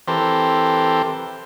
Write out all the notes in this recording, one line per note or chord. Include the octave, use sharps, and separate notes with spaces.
E3 C4 G4 A4 A#4 C5